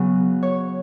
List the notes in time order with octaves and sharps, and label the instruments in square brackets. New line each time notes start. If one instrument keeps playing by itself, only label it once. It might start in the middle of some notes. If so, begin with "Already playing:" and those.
Already playing: [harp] C#3 F#3 B3
C#5